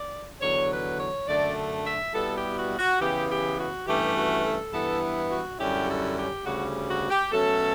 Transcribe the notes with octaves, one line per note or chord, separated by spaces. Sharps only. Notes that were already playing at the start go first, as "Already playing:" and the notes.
Already playing: D5
E2 D3 F#3 C#5
B4
C#5
F#2 D3 A3 D4 D5
E5
B2 G3 B3 E4 A4
G4
F#4
F#4
C#3 E3 B3 G4
G4
F#4
G2 E3 A3 C#4 G4
F#4
A4
G2 E3 B3 E4 A4
F#4
F#2 D3 G3 C#4 E4 G4
A4
G4
D2 C#3 G3 F#4
F#4
G4
B2 F#3 A3 C#4 A4